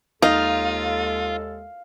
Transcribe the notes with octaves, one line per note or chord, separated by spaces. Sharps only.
D#2 G#3 D#4 F4 A4 F5